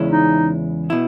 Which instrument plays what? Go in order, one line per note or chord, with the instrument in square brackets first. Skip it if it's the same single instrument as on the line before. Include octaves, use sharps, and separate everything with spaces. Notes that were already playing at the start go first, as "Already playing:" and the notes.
Already playing: [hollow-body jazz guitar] E2 C#3 G#3 C#4 E4
[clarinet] D#4
[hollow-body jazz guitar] B2 E4